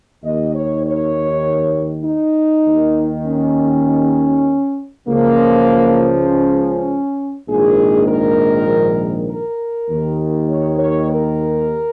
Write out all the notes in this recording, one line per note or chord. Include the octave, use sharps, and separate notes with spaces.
D#2 D#3 D#5
C#5
C#5
D#4
D#2 D#3
C#4
C#2 C#3 F3 A#3
C#4
A#1 G#2 D#3 G#4
A#4
A#4
D#2 D#3
C#5
C#5
A#4